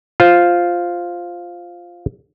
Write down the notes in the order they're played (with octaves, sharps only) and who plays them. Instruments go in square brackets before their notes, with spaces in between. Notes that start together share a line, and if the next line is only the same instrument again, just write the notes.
[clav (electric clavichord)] F4 C5